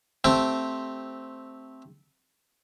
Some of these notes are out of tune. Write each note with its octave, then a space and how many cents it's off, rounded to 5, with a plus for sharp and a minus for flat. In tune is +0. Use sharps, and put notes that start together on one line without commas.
A3 +0 C4 +0 G4 +5